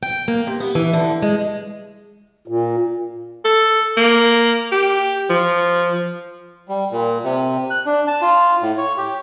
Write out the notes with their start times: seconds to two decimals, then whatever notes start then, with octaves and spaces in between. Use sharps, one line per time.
0.03 G5
0.28 A#3
0.47 C3
0.60 B3
0.75 E3
0.93 D3
1.22 G#3
2.48 A#2
3.45 A4
3.97 A#3
4.72 G4
5.30 F3
6.69 G3
6.91 A#2
7.24 C3
7.70 F#6
7.86 D4
8.08 A5
8.21 F4
8.62 A2
8.77 C#5
8.98 G4